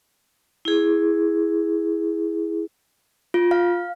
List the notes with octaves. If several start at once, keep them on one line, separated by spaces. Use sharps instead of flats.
E4 G#4
F4
F5